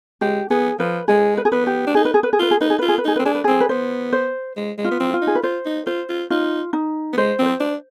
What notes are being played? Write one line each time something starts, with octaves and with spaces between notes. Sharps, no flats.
G#3 G4
B3 G#4
F3 B4
G#3 G#4
B4
G#4
B3 B4
G4
D4
D#4 G#4
B4
G#4
B4
G#4
F4 B4
G#4
D#4 B4
G#4
F4 B4
G#4
B4
D#4 G#4
C4 B4
D4 G#4
B4
C4 G#4
B4
B3 C5
C5
G#3
G#3
F4
B3
C4
F4
D#4
G#4
B4
F4 C5
D#4
F4 C5
F4
D#4 F4
D#4
B3
G#3 C5
C4
C5
D4